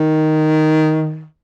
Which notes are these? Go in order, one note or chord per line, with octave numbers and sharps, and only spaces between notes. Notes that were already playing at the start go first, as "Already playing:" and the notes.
Already playing: D#3